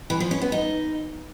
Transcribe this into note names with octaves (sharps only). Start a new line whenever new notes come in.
E3
F3
C#4
B3
D#4